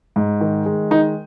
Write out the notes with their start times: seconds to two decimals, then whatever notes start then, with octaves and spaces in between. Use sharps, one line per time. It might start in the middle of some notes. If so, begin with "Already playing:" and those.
0.16 G#2
0.41 D#3
0.66 G#3
0.91 D#3 D#4